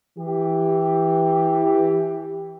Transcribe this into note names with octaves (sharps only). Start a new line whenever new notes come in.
E3 G4